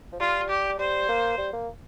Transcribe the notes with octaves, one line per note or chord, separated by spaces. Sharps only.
F3
G3 F4
G4
G3 C5
A#3
G3
A#3